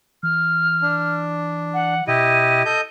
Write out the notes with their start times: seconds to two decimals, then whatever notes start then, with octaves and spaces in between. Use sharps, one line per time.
0.23 E3 F6
0.82 D4
1.74 F#5
2.08 B2 E4 G4 D#5 D#7
2.65 A4 D#5 G6